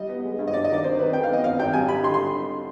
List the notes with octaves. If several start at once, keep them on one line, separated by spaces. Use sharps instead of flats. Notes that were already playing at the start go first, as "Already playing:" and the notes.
Already playing: G3 D#5
B3
G#3
G2
D#5
G2 D5
D#5
D#3 D5
C3 C5
D#3 B4
F2 G5
F5
B3 D#5
G#1 F5
G#1 G5
G3 G#5
G3 B5
D3 C6
C6